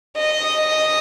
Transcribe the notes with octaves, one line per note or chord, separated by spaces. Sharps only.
D#5